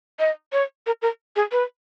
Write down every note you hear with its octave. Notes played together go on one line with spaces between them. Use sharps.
D#5
C#5
A#4
A#4
G#4
B4